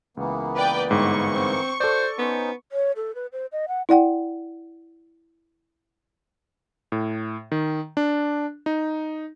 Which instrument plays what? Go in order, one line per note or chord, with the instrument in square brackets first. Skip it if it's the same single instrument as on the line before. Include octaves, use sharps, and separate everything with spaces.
[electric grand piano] C#2 [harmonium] E3 A#3 B3
[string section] B4 D5 G5
[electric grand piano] G1 G#2 [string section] C#6
[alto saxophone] C4
[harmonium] F#4 [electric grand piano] A4 D5 [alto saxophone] C5
[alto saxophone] B3 [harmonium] C#4 D#4 C5
[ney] C#5
A4
B4
C5
D#5
F#5
[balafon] E4 D5 F#5 G5
[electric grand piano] A2
D#3
D4
D#4